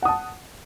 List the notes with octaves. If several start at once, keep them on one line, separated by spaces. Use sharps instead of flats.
F#5 A5 D#6